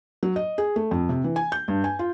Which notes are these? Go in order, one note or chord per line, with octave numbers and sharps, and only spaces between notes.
F#3
D#5
G#4
A3
F2
C3
E3
G#5
G6
G2
G#5
F4